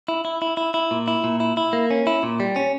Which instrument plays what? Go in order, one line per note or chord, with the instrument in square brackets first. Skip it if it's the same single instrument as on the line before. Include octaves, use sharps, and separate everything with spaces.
[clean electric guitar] E4
E4
E4
E4
E4
A#2
E4
A#2
E4
E4
A#3
C#4
E4
A#2
G3
C#4